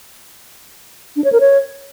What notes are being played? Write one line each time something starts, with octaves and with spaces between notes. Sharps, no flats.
D4
C#5
A#4
C#5